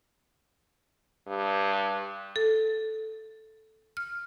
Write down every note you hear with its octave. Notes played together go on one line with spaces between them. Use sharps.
G2
A4
F6